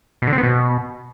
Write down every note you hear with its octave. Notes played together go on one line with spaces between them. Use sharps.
B2
D3
C4
B3
B2